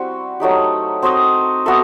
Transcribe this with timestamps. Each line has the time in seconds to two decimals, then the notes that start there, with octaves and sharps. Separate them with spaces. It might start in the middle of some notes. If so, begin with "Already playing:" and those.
Already playing: G3 C4 E4 F#4
0.40 F#3 A3 D#4 G4
1.02 C4 F#4 C5 D#5
1.66 B3 F#4 A4 E5